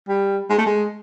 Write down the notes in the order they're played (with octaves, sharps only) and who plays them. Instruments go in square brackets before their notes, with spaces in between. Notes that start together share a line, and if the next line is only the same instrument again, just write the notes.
[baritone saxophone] G3
G#3
A3
G#3